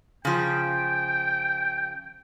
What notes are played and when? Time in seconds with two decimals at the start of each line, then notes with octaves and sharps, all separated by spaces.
0.25 C#3 F3 G5